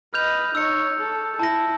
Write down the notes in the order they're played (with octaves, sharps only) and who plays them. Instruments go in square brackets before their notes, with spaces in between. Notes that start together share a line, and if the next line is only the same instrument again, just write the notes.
[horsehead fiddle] B4 D#5 [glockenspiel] F6 G6 F7
[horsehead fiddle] D#4 C#5 [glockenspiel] E6 C#7
[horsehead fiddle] A4
[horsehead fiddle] E4 [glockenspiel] A5 A#6